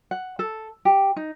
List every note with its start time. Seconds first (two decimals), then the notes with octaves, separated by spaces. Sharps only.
0.11 F#5
0.39 A4
0.85 G4
1.16 D#4